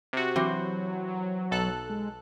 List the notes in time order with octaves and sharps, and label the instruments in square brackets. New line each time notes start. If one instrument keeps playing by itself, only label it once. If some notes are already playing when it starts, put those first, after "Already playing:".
[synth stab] C3 F#4
[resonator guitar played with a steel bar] E3 C4 C5 [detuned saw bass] F#3
[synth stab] B1 A4 F#6
[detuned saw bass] G#3